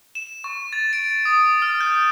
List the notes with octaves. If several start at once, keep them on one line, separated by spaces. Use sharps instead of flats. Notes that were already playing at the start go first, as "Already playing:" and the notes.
E7
C#6
A6
D7
D#6
F6
G6